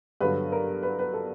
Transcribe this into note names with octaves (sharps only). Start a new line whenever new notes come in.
G2 D3 F#3 B4
A#4
B4
B4
A4